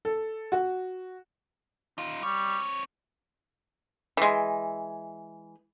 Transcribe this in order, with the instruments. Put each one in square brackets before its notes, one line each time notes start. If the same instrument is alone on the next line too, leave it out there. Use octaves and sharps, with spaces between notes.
[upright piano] A4
F#4
[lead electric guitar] D#4 F4
[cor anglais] G3 [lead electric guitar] C4 C#5
[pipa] E3 G#3